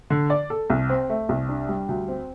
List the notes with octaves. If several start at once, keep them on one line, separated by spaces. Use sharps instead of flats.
D3
D5
A4
C2
C4
A3
C2
D4
G3
D2
C4